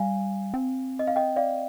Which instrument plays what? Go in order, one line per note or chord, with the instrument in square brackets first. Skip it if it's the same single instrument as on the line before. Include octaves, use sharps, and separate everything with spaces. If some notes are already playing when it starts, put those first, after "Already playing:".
Already playing: [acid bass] G3 [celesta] F5 G#5
[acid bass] C4
[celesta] D#5
F5
D#5 G5
D5 F5